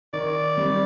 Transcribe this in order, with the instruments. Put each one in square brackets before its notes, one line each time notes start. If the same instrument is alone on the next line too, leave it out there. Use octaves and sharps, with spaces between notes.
[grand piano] D#3 [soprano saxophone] D5
[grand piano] G3 C4